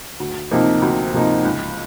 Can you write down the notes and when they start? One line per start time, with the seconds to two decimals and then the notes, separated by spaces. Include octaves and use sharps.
0.20 D2
0.51 C3 F3 A#3 D#4
0.82 D2
1.14 C3 F3 A#3 D#4
1.45 C#2